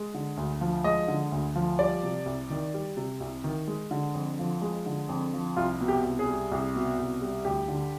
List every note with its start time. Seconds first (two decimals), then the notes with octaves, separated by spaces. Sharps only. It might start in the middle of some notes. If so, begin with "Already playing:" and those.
Already playing: G#3
0.14 D3
0.37 D2
0.61 F3
0.84 G#3 D#5
1.08 D3
1.32 D2
1.56 F3
1.79 G3 D5
2.03 C3
2.26 C2
2.50 D#3
2.74 G3
2.97 C3
3.20 C2
3.44 D#3
3.67 G#3
3.91 D3
4.14 F2
4.39 F3
4.62 G#3
4.86 D3
5.09 F2
5.33 F3
5.57 C2 F4
5.81 B2
5.88 G4
6.03 C2
6.19 G#4
6.27 G3
6.51 C2
6.75 B2
6.98 C2
7.21 G3
7.45 D2 G4
7.68 D3